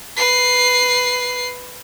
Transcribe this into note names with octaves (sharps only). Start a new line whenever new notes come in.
B4 C7